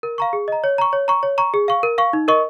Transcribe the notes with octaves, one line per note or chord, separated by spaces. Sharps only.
A#4
F5 A#5 C#6
G#4
D#5 A#5
C#5
A#5 C#6
C#5
A#5 C#6
C#5
A#5 C#6
G#4
F5 C#6
A#4
F5 C#6
D#4
A#4 D#5 C#6